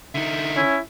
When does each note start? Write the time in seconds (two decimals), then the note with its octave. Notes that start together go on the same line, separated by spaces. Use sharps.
0.15 D3 D#4 E5
0.56 C#4 E4